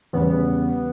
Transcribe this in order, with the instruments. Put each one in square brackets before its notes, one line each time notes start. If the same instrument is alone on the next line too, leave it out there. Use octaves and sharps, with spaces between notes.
[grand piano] E2 C#3 G3 [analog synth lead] B3